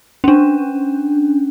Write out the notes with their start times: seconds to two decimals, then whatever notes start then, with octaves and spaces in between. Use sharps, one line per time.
0.24 C#4 D4